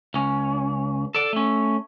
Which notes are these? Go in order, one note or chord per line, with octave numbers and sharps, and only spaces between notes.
C#2 C#4
A4 D5
A3 C#4